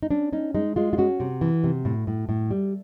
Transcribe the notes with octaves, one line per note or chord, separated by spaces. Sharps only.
D#4
C#4 D4
C#4 D#4
G#3 D#4
G#3 F4
F4
C#4 F#4
C3
E3
C3
A2
A2
A2
G3